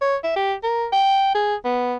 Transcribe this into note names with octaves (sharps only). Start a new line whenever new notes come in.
C#5
E5
G4
A#4
G5
G#4
B3